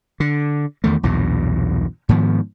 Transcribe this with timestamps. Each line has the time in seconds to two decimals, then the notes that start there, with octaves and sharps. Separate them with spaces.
0.20 D3
0.84 E2 D#3 A3
1.03 B1 E2 G2 A#2
2.09 G#2 D#3 F3 B3